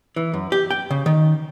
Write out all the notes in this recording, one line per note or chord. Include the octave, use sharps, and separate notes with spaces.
E3
F#2
G4
G5
C#3
D#3